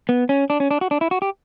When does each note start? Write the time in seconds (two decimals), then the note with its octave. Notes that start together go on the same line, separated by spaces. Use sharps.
0.09 B3
0.29 C#4
0.50 D4
0.60 C#4
0.71 D4
0.81 F#4
0.91 D4
1.01 E4
1.11 F#4
1.22 G4